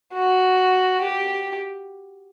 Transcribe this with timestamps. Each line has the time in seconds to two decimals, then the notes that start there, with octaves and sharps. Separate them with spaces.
0.13 F#4
1.02 G4